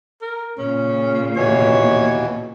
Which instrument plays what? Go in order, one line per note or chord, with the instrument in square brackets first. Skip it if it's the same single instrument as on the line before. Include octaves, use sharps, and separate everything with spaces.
[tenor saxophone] A#4
[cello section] A#2 C#3 [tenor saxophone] C#4
[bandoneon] D#2 B2 E3 [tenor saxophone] C#5